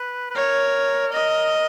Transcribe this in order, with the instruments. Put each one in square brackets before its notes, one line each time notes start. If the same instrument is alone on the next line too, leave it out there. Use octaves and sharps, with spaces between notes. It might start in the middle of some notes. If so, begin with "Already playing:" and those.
Already playing: [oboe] B4
B4
[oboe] A#4 [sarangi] C#5
[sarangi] D#5